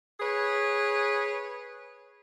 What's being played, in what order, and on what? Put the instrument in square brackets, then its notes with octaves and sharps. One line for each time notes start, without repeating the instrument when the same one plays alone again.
[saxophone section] G#4 B4 C#5